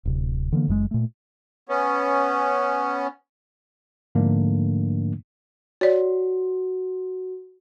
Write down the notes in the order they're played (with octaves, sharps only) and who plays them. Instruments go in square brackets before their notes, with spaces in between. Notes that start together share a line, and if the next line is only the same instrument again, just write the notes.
[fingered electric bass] D1 C3
D3 E3 G#3 A#3
F#1 F#2 D#3 G#3
A#2 A3
[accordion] B3 C#4
[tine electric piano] G#2 D3 F3 A3 A#3 D4
[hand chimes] F#4 [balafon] C#5 D5